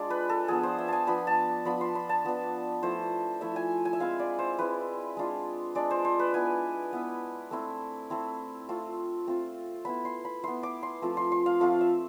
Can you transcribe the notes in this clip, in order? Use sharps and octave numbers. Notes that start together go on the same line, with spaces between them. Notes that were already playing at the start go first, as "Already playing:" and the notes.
Already playing: G#3 D4 F4 D5
B4
A4
F3 B3 D4 G#4
C5
E5
G#5 A5
F3 B3 D4 B5
A5
F3 B3 D4 B5
C6
B5
A5
F3 B3 D4
F3 A3 E4 C5
F3 A3 E4 E5
G#5
G#5
E5
G#3 C4 E4 F5
D5
C5
G#3 C4 E4 B4
G#3 D4 F4
G#3 D4 F4 D5
C5
C5
B4
B3 E4 G#5
B3 E4
A3 C4 E4
A3 C4 E4
A3 C4 F4
A3 C4 F4
B3 E4 B5
C6
B5
B3 E4 C6
D6
C6
F3 A3 C4 F4
C6
C6
F5
F3 A3 C4 F4 F5
E5